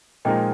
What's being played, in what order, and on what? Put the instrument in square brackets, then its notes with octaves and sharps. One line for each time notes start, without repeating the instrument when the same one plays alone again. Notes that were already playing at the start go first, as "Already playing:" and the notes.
[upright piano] A#2 F3 G#3 D#4 A#4 [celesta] D#5 G5